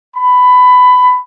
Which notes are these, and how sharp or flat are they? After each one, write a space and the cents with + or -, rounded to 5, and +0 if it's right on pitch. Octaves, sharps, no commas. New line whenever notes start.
B5 +15